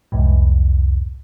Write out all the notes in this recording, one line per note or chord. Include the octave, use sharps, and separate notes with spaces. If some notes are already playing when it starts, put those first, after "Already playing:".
C2 F2 G#2